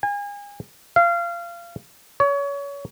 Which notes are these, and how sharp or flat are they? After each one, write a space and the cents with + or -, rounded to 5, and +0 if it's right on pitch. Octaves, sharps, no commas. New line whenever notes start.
G#5 -35
F5 -25
C#5 +30